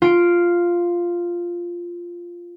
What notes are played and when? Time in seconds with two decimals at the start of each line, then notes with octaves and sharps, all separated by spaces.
0.02 F4 D7